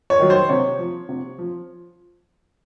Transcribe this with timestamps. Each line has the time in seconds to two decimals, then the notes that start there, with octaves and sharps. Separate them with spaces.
0.10 C#5
0.20 D#3 F#3
0.30 C5
0.49 C3 C#5
0.79 F3
1.09 C3
1.39 F3